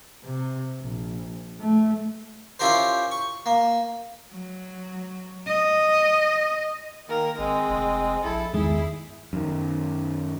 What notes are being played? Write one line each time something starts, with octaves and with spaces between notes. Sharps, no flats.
C3
A#1
A3
C#4 E4 F4 G4 A#4 C5
C#6
A#3
F#3
D#5
D#3 A#3 A#4
G#1 G#3 C4
F1
A#1 E4 A4
E2 G2 D#3 G#3 E4 G#4
F#2 D#3